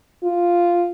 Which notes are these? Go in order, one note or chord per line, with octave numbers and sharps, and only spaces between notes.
F4